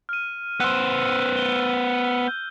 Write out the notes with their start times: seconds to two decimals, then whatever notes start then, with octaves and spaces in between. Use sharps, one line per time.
0.09 F6 D#7
0.60 B3 C5 E6 F#6
1.37 G7
2.28 G6